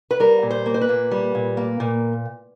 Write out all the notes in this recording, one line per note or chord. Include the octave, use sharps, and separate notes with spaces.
B4
G3 A#4
A#2
C5
A#3
C5
B4
A#2
G3
A#2
A#3
A#2